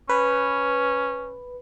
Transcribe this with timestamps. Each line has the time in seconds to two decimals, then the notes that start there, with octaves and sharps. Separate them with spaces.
0.09 C#4 B4